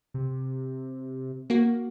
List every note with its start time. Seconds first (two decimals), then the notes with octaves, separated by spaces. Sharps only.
0.14 C3
1.50 A#3 F#4